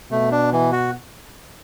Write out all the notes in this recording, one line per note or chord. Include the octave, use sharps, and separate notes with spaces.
B2 A3
D4
E3
F#4